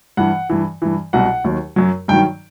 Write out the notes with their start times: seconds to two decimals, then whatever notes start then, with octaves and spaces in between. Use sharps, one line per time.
0.17 G2 E3 F#5
0.49 G2 E3
0.82 G2 E3
1.13 C2 B2 F#3 F#5
1.44 D#2 D#3 F#3
1.76 F#2 F#3
2.08 G2 D#3 F#3 G5